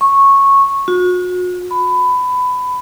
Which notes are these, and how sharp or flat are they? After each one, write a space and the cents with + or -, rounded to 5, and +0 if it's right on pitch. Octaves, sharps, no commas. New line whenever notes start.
C#6 -10
F#4 -40
B5 +20